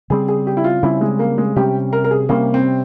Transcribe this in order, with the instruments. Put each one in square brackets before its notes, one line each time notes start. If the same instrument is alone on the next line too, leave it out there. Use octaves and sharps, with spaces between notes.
[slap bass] C#3 G3 C4 [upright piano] G#4
[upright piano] G#4
G4
E4
F4
[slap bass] C#3 G3 C4 [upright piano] E4
[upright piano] G#3
A#3
G#3
[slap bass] C3 G3 C#4 [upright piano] G4
[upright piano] A#4
A#4
G#4
[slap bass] C3 G3 C#4 [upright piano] A#3
[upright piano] C4